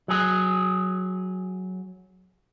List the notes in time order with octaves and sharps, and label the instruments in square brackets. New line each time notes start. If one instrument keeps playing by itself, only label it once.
[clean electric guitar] F#3 G#4